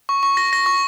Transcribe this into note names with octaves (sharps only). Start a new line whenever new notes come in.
C#6
C#6
A#6
A#6
C#6